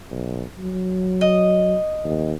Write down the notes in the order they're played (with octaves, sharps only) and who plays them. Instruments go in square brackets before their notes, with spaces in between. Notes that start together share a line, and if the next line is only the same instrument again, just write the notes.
[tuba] B1
F#3
[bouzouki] D#5
[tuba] D#2